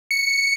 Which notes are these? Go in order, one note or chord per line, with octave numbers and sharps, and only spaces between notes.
C#7